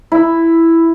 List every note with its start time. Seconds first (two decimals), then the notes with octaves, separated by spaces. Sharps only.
0.12 E4